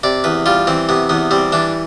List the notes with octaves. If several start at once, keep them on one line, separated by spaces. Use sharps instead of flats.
C3 D5
E2 B4
G3 F4
E3 C4
C3 B3
E2 B3
G3 C4
E3 D4